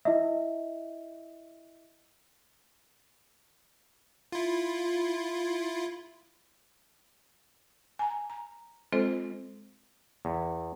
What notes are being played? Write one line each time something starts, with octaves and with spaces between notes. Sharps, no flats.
E4 D#5 E5
E4 F4
G#5 A#5
A#5
G#3 C4 F4 A4 C5 D#5
E2